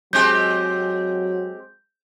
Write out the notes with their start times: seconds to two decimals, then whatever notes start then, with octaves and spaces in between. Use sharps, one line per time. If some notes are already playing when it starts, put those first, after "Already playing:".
0.13 F#3 G#3 C4 G4 G6